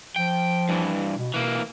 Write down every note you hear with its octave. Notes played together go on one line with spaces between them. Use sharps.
F3 G5
G2 E3
B2
B2 E3 A#3